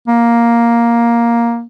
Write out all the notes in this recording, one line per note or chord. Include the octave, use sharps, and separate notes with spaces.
A#3